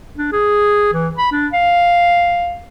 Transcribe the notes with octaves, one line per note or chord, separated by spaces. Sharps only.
D4
G#4
E3
B5
D4
F5